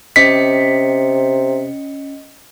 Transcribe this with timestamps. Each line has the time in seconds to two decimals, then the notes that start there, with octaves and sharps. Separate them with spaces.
0.16 C3 C#4 D#5 B6 C#7